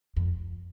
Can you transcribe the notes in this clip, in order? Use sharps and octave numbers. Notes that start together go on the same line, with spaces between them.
F2